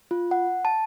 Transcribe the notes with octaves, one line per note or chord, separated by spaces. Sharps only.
F4
F#5
A5